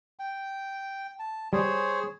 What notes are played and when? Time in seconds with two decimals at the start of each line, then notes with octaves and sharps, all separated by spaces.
0.19 G5
1.19 A5
1.53 G3 G#4 C5 C#5